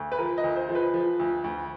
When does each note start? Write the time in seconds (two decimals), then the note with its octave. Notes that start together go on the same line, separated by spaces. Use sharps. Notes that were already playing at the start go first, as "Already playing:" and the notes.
Already playing: D2
0.12 B4
0.18 F3 A#4
0.38 D#5
0.44 D2
0.56 C5
0.69 F3
0.75 B4
0.94 F3
1.19 D2
1.44 D2